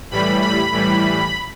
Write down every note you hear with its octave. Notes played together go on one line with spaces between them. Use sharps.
A2 E3 G3 B5
B5
A2 E3 G3